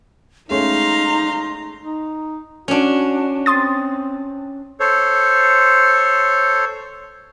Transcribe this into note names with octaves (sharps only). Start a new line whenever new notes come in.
G#3 A3 C#4 D#4 F5 A#5 C6
D#4
C#4 D4 F#4
C4 C6 D#6 A6
A4 C5 C#5